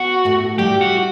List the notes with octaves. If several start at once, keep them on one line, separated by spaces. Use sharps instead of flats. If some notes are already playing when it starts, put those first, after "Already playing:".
Already playing: B3 F#4
A2 A3
G3 G4
F#4